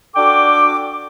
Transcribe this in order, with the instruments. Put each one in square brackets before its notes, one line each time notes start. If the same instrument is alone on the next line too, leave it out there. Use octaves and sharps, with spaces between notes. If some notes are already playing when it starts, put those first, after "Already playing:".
[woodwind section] D4 F#4 A4 G5 D6